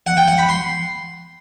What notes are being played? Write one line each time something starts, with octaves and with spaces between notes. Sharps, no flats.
F#5
G5
F#5
B5
C6